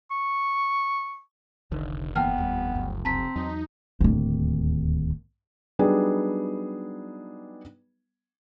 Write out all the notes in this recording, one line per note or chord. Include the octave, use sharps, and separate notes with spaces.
C#6
F1 C2 D3 D#3
G1 E3 A#3 B3 G5 A5 F6
D#2 F#3 G3
C#2 F#2
F1 C4 A5 A#5 B6
E2 F#3 D#4
D1 D#2
F#3 G3 B3 D4 D#4 G#4